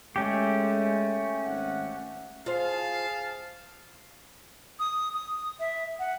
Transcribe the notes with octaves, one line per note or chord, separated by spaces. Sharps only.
G#3 A3 C#4 G4
G#1 F#5
F4 G#4 C5 F5 A5
D#6
D#6
E5
F#5